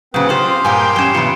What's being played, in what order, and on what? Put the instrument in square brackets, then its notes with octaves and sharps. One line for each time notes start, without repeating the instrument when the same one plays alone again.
[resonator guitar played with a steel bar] A#2 C#3 [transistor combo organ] F#3 [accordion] C4 B4 [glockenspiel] D#6
[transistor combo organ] C4 [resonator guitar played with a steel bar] F4 C5 [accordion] G4 F5 [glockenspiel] C6
[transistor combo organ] G2 G5 [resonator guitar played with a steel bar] A#2 A#3 G#5
[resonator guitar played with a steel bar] F#3 C#4 [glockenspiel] C7 E7
[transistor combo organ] B2 [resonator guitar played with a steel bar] E3 F4 [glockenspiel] C#7 D7